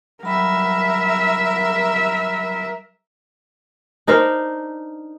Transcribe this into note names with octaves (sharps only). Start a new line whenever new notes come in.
F#3 G3 A#4 E5 B5
D4 D#4 A#4 C5